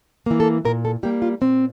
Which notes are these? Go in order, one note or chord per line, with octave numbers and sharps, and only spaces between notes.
E3 A#3
A4
A#2 A#4
A4
G3 A#3 G4
F4
A#2 C4